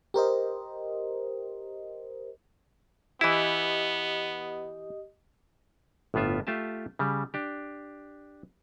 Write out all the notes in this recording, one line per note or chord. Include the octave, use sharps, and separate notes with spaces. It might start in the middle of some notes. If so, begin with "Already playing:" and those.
G4 A#4 C5 D#5
E3 B3 E4 G4 D#5 D#6
G1 A2 B3 F4 E5
A3 F4 G4 E5 A5
C#3 G3
D4 G4